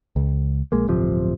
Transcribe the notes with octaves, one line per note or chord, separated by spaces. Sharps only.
C#2
A#1 G#3 A#3
D1 G1 C3 F3